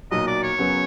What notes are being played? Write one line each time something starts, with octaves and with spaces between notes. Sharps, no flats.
B1 A#2 F#3 D#5
D5
C#5
F#2 C#3 F#3 B3